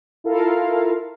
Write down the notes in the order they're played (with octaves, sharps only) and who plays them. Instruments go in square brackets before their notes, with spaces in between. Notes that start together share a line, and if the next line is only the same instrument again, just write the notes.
[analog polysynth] E4 F4 A4 A#4 F5